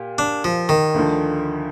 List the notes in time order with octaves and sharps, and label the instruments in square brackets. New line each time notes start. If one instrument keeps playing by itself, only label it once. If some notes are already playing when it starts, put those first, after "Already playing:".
Already playing: [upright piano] A#2 G4
[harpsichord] D4
F3
D#3
[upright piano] D2 D3 F3